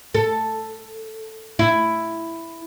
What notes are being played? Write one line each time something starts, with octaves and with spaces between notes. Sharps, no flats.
A4
E4